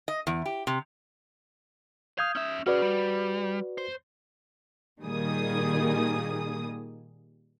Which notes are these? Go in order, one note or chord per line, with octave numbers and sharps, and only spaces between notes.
D#5
E2
G4
C3
F5 D#6 G6 G#6
C#4 E5
C#4 F#4 G#4 B4 D5
G3
C5
A#2 D#3 G3 A#3 G#4 D#6